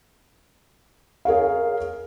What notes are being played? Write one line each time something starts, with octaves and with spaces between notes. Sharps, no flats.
G#4 A#4 C#5 F5